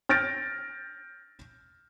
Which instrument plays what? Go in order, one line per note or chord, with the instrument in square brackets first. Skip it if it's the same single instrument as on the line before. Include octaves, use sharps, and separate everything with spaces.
[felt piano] F6 G6 A6 A#6 D7